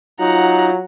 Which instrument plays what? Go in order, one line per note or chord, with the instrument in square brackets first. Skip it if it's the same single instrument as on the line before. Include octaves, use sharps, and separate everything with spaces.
[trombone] F#3 [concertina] D#4 [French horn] F4 [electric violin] F#5 A#5